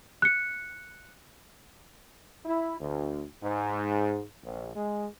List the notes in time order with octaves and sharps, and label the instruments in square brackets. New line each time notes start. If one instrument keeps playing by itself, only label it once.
[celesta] F#6 C#7
[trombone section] E4
D2
G#2
A#1
G#3